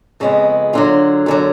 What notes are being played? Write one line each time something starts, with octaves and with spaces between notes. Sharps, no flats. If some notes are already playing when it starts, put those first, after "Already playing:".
F2 C#3 G#3 B3
F#2 D3 F#3 F4
F#2 D3 F#3